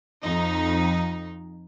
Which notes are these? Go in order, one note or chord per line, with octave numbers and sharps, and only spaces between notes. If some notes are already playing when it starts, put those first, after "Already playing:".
F2 D#4